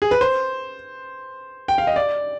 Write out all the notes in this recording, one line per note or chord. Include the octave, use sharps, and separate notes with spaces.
G#4
B4
C5
G5
F5
D#5
D5